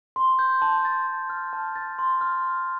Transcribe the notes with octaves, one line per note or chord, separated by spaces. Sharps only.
C6
G6
A5
A6
C6
F6
A5
A6
C6
F6